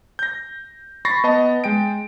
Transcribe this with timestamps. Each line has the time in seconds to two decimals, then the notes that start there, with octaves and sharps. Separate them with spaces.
0.19 G6 A#6
1.05 B5 C#6 A6 A#6 C7
1.24 B3 D#5 A5
1.64 G#3 G5 D7